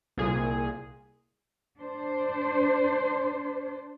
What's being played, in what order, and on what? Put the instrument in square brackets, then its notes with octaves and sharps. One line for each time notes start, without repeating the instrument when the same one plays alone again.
[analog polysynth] C2 A#2 G#4
[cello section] D4 C5